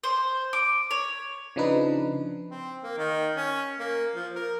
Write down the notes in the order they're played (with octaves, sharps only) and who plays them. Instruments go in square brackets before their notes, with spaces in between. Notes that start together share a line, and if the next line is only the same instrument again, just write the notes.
[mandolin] C5
D6
C#5
[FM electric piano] C#3 F3 D4 D#4 B4
[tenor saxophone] C4
A#3
D#3
C#4
A#3
F3
A#4